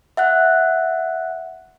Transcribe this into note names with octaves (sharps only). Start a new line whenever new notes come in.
E5 F#5 F#6